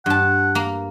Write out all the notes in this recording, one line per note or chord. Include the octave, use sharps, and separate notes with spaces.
G2 F#5 A5
A#3